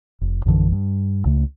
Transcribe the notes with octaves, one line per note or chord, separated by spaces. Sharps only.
F1
A#1 F#2 D3 E3
G2
C#2 C#3 A3